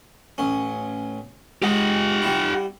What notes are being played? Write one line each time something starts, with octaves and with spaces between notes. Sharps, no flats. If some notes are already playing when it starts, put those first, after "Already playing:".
A1 C#4
G#3 G4 F#5
G3 E4